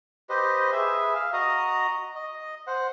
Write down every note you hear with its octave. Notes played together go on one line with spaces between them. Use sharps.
G4 B4 C5 D#5
G#4 B4 E5
F5
F#4 D#5 A#5 D#6
D#5
C5 F#5